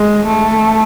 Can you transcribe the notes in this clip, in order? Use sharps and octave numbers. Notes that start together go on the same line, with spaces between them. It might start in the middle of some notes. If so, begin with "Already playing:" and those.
Already playing: G#3
A3